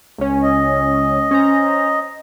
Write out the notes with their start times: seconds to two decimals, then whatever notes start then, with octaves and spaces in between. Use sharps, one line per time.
0.18 C#2 C#4
0.43 D#5
1.31 C#4 C5 A#5